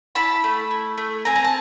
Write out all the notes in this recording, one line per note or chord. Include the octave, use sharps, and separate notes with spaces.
E4 A5 B5
A3
E4
A3
C4 G#5 A#5
A#5
A5